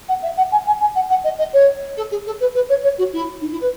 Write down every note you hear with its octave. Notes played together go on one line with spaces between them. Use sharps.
F#5
E5
F#5
G#5
G#5
G#5
F#5
F#5
D#5
D#5
C#5
A4
G#4
A4
B4
B4
C#5
C#5
F#4
E4
D#4
E4
B4